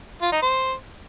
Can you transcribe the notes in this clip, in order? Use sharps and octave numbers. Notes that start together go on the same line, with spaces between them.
F4
D#4
C5